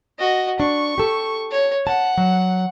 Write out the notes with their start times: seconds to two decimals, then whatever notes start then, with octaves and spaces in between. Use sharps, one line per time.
0.19 F#4 D#5
0.60 D4 C#6
0.98 G4 A4
1.51 C#5
1.87 F#5 A5
2.17 F#3